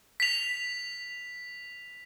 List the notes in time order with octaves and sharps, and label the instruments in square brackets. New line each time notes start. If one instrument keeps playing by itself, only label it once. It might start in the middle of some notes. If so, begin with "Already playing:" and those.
[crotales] B6 F7